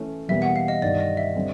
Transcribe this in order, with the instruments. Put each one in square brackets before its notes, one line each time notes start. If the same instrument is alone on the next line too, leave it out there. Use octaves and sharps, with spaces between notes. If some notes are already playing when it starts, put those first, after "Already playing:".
Already playing: [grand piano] E3 A3 C#4
[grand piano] E2 B2 G3 A#3 [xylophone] E5
[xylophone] F#5
F5
D#5
[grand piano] G2 D#3 G3 [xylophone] D5
[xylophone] D#5
E5
[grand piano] D3 G3 C4